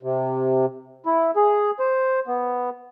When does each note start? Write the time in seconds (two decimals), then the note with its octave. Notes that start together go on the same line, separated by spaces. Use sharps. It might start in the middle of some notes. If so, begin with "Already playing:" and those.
0.03 C3
1.06 E4
1.36 G#4
1.80 C5
2.27 B3